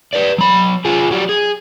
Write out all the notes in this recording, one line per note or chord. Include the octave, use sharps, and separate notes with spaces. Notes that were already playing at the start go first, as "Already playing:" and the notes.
B4 D5
F#3 B5
F4 G#4
F#3 G3
G#4